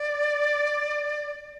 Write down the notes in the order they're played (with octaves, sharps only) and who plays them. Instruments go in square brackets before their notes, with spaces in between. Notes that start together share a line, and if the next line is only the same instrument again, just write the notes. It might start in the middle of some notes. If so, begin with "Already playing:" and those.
Already playing: [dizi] D5